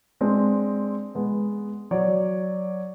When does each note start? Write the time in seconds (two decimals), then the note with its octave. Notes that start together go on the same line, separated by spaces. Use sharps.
0.21 G#3 C4 D4
1.15 G#3 B3
1.91 F#3 C#5 D5